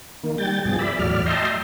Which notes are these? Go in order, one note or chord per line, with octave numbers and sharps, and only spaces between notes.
D#3 A#3
G3 G5 A6
G2 B2 F3 G#4 A6
D5 E5 B5
E2 A2 F#3 D5 F6
D#5 E5 G5 A5 A#5 C6